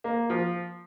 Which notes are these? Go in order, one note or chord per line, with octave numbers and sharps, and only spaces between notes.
A#3
F3